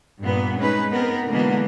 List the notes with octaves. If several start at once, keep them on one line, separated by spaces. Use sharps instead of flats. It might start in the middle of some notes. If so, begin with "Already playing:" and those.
G2 A#2 B3
G#3 C#4 D#4 B4
B3 C4 A#4
B2 D3 E3 G#3 A#3 B3